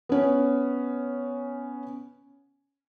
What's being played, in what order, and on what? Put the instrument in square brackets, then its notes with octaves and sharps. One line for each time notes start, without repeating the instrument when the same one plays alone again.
[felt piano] B3 C#4